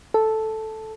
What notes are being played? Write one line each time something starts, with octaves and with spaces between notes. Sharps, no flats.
A4